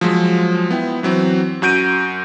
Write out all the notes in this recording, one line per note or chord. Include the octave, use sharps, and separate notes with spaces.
F3 F#3 G#3
B3 E4 G5
E3 F#3 C4
F#2 F#4 G6 D7 D#7